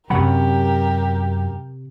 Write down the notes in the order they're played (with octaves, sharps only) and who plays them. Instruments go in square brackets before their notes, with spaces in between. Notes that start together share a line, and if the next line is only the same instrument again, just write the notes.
[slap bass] F#2 F#3 [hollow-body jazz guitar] C3 F#5 B5 [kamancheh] G4 A#4